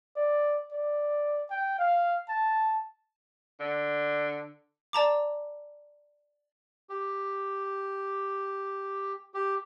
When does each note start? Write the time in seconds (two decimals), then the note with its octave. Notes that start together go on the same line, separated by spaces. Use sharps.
0.16 D5
0.72 D5
1.50 G5
1.78 F5
2.29 A5
3.60 D3
4.93 D5 A5 A#5 D6
6.90 G4
9.34 G4